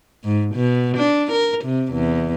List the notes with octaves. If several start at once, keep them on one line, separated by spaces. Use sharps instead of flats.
G#2
B2
D4
A#4
C3
E2